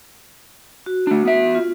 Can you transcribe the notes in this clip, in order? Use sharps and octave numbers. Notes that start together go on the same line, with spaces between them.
F#4
A3 D4
B3 E5
F4